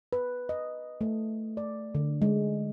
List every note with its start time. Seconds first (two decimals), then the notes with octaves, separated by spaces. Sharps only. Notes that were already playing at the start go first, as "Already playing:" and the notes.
0.13 B4
0.49 D#5
1.01 A3
1.57 D5
1.95 D3
2.22 G#3